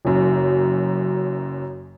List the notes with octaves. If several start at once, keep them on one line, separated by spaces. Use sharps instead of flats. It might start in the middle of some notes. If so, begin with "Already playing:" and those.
F#1 F#2